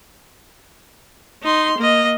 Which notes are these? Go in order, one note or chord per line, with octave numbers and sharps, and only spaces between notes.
D#4 C6
A#3 D#5